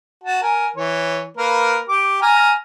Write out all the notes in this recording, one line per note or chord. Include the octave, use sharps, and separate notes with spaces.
F#4 A5
A#4 G#5
E3 C#5
A#3 A#4 B4
G4 D6
G#5 A#5 F6